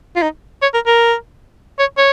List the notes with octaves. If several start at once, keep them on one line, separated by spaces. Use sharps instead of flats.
F4
D#4
C#5
A#4
A#4
C#5
C#5